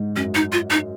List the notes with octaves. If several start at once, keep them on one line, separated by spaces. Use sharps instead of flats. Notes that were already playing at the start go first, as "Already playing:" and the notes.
Already playing: G#2
F#2 C#4
D#4
F4
D#4